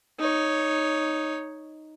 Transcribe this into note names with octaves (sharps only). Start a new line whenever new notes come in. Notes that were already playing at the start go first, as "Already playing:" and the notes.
D#4 C#5